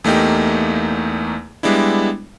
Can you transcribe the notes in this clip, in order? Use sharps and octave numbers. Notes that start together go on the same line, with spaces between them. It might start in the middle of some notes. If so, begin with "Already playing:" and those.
E2 A3 A#3 D#4 G4
G3 G#3 B3 D4 E4